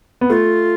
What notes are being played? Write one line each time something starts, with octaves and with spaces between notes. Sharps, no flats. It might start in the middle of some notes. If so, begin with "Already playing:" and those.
B3
A3 F4